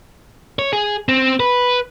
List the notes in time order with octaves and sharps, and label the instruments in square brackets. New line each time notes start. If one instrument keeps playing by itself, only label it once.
[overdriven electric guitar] C#5
G#4
C4
B4